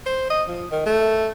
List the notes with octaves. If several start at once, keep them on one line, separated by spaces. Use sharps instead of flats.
C5
D#5
F3
D#3
A3